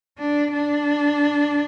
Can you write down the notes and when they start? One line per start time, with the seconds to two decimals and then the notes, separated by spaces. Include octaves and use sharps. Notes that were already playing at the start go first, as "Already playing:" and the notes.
0.18 D4
0.52 D4